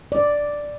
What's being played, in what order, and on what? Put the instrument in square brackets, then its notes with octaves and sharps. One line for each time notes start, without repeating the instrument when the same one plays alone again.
[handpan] D5